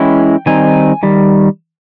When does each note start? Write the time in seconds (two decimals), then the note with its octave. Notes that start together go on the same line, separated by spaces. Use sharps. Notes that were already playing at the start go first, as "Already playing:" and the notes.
Already playing: E3 G#3 C#4 E4 G5
0.46 D#3 G3 C4 D#4 G#5
1.03 D#3 G3